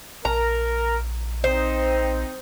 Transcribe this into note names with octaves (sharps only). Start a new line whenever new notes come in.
A#1 A#4 A#5
C4 D#4 C5